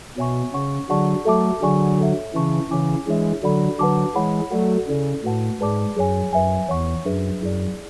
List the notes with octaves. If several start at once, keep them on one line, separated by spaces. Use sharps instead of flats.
B2 F#4 C#5 E5 G#5 C#6
C#3 C#5 F#5 C#6
D3 F#3 G#4 D5 F#5 A5 C#6
F#3 A3 A4 E5 A5 D6
D3 F#3 G#4 D5 G#5 C#6
A4 C#5 E5
C#3 E3 B4 E5 A5 C#6
C#3 E3 G#4 C#5 G#5 D6
E3 G#3 D4 G#4 C#5 E5
D3 F#3 A4 D5 F#5 B5
D3 F#3 B4 F#5 A5 D6
E3 G#3 C#5 F#5 B5
F#3 A3 F#4 A4 D5 F#5
C#3 E4 A4 D5
A2 F#4 B4 F#5 A5
G#2 G#4 B4 D5 A5 D6
F#2 G#4 C#5 G#5
F#2 B4 E5 G#5
E2 C#5 F#5 C#6
F#2 D4 G#4 B4 E5
F#2 E4 G#4 D5